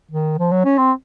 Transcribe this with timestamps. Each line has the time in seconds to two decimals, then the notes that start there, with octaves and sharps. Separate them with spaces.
0.11 D#3
0.39 F3
0.51 F#3
0.65 C#4
0.78 C4